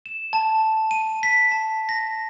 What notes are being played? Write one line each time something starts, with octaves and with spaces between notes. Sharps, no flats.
E7
A5
D#7
B6
A5
A#6